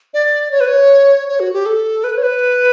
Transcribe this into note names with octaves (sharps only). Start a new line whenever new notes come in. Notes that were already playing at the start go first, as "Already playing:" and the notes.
D5
C#5
B4
C#5
C#5
F#4
G4
A4
B4
C#5
B4